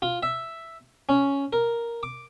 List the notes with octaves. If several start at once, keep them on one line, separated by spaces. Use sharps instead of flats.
F4
E5
C#4
A#4
D6